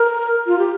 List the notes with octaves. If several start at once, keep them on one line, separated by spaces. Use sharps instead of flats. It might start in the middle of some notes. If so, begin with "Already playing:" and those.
Already playing: A#4
F4
G4